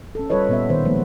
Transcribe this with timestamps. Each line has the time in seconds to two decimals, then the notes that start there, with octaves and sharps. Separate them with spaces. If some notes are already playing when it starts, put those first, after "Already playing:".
0.15 C#4 A4
0.30 G3 F4 A4 B4 C#5 D#5
0.49 A#2 B3 E5
0.69 B2 D#3 B3 C5
0.85 F3 G#3 A#3 B3 B4